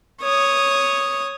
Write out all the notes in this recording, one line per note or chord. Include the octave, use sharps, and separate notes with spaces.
C#5 D#6